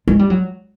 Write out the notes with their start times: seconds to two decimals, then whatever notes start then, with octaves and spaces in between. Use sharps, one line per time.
0.08 G#3
0.19 G3
0.30 F#3